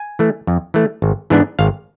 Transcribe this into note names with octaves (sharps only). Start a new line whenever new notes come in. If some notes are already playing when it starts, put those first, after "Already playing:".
Already playing: G#5
E3 A3
F2
E3 A3
G#1
G#2 E3 B3 D4
G#1 F5